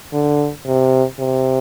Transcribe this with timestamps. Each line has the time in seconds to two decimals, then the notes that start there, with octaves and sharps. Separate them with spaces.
0.13 D3
0.66 C3
1.20 C3